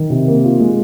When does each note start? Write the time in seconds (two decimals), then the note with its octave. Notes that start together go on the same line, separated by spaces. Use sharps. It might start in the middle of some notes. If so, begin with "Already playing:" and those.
Already playing: D#3
0.10 C3
0.28 A#3
0.44 F4
0.60 G#3